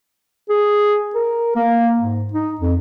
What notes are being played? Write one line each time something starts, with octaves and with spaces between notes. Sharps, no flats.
G#4
A#4
A#3
G#2
D#4
F2